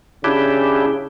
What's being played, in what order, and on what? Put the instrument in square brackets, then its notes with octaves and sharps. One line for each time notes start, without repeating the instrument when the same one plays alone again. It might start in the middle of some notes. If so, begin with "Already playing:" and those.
[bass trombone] C#3 [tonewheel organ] D4 E4 G4